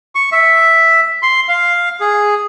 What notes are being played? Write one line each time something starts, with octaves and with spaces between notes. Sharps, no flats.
C#6
E5
C6
F5
G#4